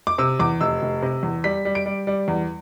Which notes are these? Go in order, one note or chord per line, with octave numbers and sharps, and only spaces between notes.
D6
C3 E6
E2 D6
F1 E6
F1
C3
E2
G3 B6
G3
D7
G3
G3
E2